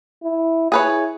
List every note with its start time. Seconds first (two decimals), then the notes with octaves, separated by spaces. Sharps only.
0.23 E4
0.72 E4 G#4 B4 C#5